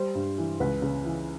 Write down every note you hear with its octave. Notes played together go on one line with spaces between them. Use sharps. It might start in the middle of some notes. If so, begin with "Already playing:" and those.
Already playing: G3 C5
G2
E3
C#2 B4
C#3
E3